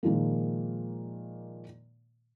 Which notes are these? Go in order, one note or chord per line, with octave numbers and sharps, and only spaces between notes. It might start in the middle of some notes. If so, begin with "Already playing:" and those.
A#2 D#3 F3 G#3 A#3